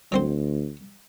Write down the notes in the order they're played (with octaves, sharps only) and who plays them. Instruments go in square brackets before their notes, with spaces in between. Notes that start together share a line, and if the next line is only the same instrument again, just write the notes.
[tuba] D2 [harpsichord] F#3 C4 C5